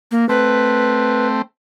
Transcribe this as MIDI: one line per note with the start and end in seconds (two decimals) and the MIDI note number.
0.11 0.28 58
0.29 1.42 57
0.29 1.42 60
0.29 1.27 71